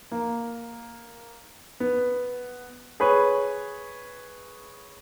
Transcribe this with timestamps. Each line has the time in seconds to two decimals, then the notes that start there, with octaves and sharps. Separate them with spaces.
0.12 A#3
1.80 B3
3.00 G#4 B4 C#5